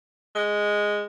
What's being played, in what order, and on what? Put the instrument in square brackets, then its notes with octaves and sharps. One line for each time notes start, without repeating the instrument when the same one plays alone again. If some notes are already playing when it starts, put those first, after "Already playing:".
[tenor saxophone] G#3